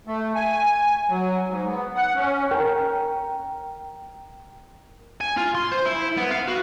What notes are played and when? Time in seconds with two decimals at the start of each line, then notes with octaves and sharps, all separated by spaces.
0.07 A3
0.36 G#5
1.09 F#3
1.48 G#2
1.67 B3
1.96 F#5
2.15 C#4
2.51 A#4 G5
5.21 G#5
5.37 F4
5.55 C6
5.72 C5
5.86 E4
6.17 B3
6.32 F5
6.48 F#4